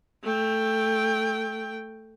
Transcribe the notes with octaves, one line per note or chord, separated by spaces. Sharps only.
A3 G5